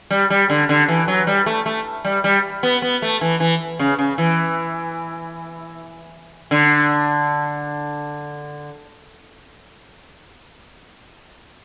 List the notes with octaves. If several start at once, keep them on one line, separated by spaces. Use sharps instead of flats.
G3
G3
D3
D3
E3
F#3
G3
A3
A3
G3
G3
B3
B3
A3
E3
E3
C#3
C#3
E3
D3